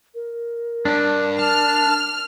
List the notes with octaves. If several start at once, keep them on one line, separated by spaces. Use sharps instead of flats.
A#4
G2 D4
A5 F6